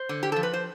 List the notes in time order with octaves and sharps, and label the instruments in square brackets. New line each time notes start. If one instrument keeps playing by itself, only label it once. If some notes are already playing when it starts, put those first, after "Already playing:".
Already playing: [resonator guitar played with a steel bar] C5
D3
G4
F3 A4
B4
C5